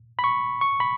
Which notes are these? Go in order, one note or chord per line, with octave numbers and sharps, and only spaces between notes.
B5
C#6
C#6
B5